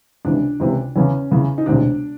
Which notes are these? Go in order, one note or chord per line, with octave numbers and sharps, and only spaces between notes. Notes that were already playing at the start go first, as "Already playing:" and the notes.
C#2 C3 E3 D4
C#2 C3 E3
E2 C#3 E3 C#4
E2 C#3 E3
D#4
E1 D2 C3 D4